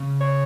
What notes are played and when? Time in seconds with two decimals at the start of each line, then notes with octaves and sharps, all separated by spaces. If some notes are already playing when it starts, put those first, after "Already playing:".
Already playing: C#3
0.21 C#5